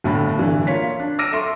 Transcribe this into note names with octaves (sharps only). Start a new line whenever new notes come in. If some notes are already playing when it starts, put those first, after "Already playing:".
G1 A2 D3 A5 B5
G2 D3 E3
A#3 F4 C#5 B6
D4
D6 E6 F6 A#6 D7 D#7
A4 E5 C6 C#6